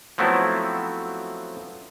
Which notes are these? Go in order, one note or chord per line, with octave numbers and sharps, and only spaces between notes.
F3 F#3 A3 B3 C4 E4